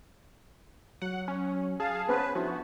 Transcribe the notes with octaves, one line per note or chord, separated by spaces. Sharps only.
F#3 F#5
C#4
G#4 F5 A5
B3 C#4 B4 C5
F3 B3 D4 E4 F#4 C5